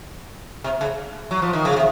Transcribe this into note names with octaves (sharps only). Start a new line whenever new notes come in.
C3
C#3
F#3
F3
D#3
C#3
C3